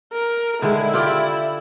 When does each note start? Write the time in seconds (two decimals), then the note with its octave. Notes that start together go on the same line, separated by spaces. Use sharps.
0.13 A#4
0.62 D3 D#3 G#3 E4
0.94 F4 G4 D5